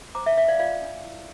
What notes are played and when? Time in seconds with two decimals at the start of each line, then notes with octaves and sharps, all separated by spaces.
0.15 C5 A#5 D6
0.26 E5
0.37 D4 E5
0.48 D5 F5
0.59 F4 D5 F5
0.82 D4
1.04 E4